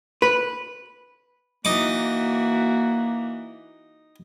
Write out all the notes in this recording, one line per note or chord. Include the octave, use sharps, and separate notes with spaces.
B4
E3 A#3 D#4 F#4 D6